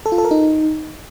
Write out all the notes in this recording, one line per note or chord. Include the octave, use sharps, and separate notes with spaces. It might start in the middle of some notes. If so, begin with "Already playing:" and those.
A4
F4
A4
A#4
D#4